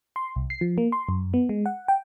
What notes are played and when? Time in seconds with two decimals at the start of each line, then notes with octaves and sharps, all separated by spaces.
0.16 C6
0.36 C2
0.50 C7
0.61 F3
0.78 A#3
0.92 C6
1.09 F#2
1.34 B3
1.49 G#3
1.66 F#5
1.88 G5